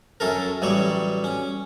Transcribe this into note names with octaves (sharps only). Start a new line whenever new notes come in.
F#2 C#4 A4 A#4
A1 F#3 G3 C#5
C#4